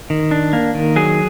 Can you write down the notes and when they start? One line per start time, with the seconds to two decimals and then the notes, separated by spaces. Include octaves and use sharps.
0.10 D#3
0.31 D4
0.53 A#3
0.75 D#3
0.96 F#3 G#4